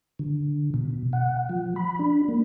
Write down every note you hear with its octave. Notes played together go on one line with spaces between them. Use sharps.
D3
B2
F#5
F3
B5
D4
A#3